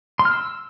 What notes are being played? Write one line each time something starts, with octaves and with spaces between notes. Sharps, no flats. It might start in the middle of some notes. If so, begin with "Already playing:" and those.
C6
F6
E6